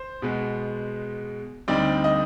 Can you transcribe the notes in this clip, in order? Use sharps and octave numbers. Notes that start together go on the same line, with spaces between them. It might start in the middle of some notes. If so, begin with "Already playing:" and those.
Already playing: C5
B2 G#3 B3
D2 D3 G3 C4 D#4 D5
D#5